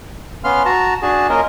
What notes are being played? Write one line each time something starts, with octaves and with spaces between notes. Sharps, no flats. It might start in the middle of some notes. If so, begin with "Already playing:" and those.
B3 C#4 F5 C6 F6
F#4 A5 A#5
D4 F#4 G#4 A5
A#3 C#4 F4 A#4 D#5